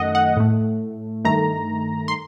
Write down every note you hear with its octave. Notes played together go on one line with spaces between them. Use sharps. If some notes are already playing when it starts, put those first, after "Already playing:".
Already playing: F#2 D#3 A3 D#5 F#5
F#5
A2 A3
G2 D#3 A3 A#5
C6